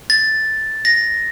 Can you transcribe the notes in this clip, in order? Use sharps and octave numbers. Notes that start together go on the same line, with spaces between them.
A6
A#6